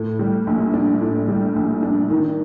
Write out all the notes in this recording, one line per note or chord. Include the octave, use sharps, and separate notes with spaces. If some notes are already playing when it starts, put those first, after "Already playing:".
Already playing: A2
G3
A#1
D4
A2
G3
A#1
D4
D#3